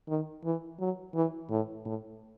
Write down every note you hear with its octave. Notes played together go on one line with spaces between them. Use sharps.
D#3
E3
F#3
E3
A2
A2